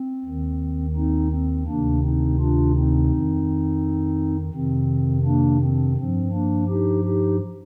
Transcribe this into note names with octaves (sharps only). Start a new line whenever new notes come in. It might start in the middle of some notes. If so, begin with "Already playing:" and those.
Already playing: C4
D#2 D#3
C4 D#4
C4
D2 C3 D#3 A#3 D4
C4 D#4
D4 F4
C4 D#4
F2 D#3
F2 C3 D#3 C4
A#3 D4
C4
G2 F3 C4
A#3 D4
D#4 G4
D#4 G4